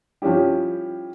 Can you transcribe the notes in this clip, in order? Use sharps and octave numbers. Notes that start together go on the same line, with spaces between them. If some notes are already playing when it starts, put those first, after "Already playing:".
F3 G3 C#4 E4 G4